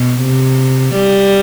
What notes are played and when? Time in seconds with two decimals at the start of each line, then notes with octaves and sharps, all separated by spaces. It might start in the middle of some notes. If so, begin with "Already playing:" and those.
Already playing: B2
0.21 C3
0.95 G3